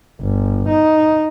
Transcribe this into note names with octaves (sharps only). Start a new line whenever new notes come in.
G1
D#4